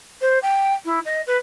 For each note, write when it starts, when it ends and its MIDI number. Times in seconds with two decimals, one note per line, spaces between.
0.21 0.39 72
0.42 0.73 79
0.85 0.99 64
1.05 1.21 75
1.27 1.37 71